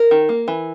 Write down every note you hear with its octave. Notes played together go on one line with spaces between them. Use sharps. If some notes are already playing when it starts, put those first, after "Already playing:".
Already playing: A#4
D#3
A#3
E3